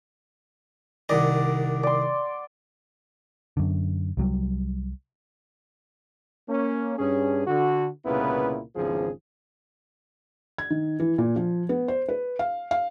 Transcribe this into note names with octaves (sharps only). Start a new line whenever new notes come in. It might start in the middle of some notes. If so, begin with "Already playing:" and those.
C2 D#3 D5 D#5 F#5
D5 C6
F#2 D3
C2 F#3 G3
A#3 C#4
G2 C#4 G#4
D3 F#4
C2 A#2 C#3 B3 E4 B4
G#1 E2 C#3 F3 G#4
G#6
D#3
E3
A#2
F3
B3
C5
B4
F5
F5